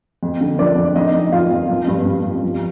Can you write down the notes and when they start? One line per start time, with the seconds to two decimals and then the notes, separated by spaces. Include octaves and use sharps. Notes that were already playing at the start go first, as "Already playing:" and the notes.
0.23 F2
0.41 D3
0.59 F3 D4 D5
0.77 F2
0.96 F2 D#4 D#5
1.14 F2
1.32 F2 F4 F5
1.51 F2
1.70 F3
1.88 G2
2.06 G2
2.25 G2
2.43 F3